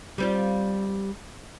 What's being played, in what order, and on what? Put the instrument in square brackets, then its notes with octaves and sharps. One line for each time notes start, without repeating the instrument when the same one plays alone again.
[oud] G3 C4 F4